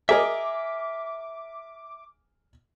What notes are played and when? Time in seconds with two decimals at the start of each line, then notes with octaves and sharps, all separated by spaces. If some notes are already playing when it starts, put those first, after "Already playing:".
0.09 G#4 A#4 D#5 E5 D6